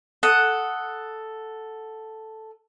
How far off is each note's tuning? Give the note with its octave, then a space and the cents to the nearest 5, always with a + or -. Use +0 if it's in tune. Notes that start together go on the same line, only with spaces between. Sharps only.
A4 +0 F#5 +0 D#6 +0